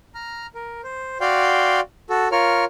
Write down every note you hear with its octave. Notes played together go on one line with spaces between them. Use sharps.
A#5 F6
A#4
C5
F#4 D5 F5 G5 C6
F#4 A4
F4 A#4 C#5 F6